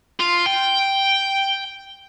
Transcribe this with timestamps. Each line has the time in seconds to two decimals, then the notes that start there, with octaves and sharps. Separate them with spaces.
0.20 F4
0.46 G5